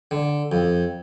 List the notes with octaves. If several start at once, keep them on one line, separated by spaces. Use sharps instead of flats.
D3
F2